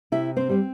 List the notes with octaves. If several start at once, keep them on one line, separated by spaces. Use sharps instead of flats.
C3 E4 E5
C4 C5
G3 C4